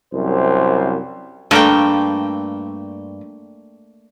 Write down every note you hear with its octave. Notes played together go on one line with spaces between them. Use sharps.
C2 F#2 C5
G2 A3 A#3 G5